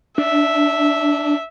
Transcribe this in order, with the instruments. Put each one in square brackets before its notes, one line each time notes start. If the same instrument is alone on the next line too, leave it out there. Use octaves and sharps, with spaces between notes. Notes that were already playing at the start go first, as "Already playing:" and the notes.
[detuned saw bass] D4 [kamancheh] E5